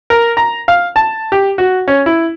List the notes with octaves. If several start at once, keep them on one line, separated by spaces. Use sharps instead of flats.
A#4
A#5
F5
A5
G4
F#4
C#4
E4